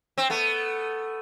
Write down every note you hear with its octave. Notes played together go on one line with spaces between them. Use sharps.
C4
A3 B3